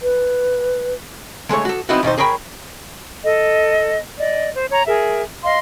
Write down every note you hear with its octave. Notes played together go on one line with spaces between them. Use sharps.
B4
D3 G#3 A3 C#5
F#4 A4
B3 C4 D#4 E4 F#4
D#2 B2 D#4 C5
G#4 A#4 C#5 G5 B5
A4 D#5
D5 D#5
C5
C#5 A#5
G#4 A#4 E5
D#5 F5 C6